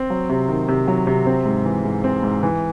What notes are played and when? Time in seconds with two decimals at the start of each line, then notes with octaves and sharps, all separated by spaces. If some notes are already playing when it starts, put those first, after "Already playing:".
Already playing: C4
0.10 F#3
0.29 C3
0.48 D#3
0.68 C3
0.88 F#3
1.07 C3
1.26 C4
1.46 G#2
1.65 E3
1.84 G#2
2.04 C4
2.23 G#2
2.43 E3